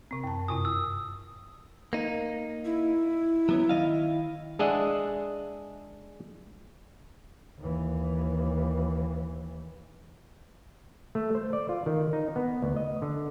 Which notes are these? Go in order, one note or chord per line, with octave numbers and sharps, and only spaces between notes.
C3 C4
F#2 A5
G2 C3 E4 D#6
E6
A#3 D#4
E4
F#3 B3 C#4
D#3 D#5 F5
G#3 D4 G#4 D#5 E5 F#5
D#2 E3
A3
C5
D5
F4
D#3
D#4
B3
D2
D#5
D3